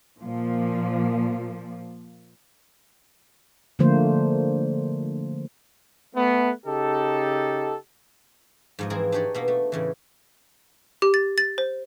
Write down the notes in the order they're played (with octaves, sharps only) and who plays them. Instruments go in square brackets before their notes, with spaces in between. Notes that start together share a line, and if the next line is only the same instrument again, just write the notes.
[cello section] A#2 F3 A#3
[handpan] D3 F3 A3 A#3 C5
[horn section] A3 B3
C#3 D#4 G4 A4
[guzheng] G#2 F3 D#5
E3 F3 C4 E4 G#4 A#4
D4 D#4 G4 C#5 D5
B2 A#3 B3
A3
A2 C#3 E3
[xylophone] G4
A6
A6
C5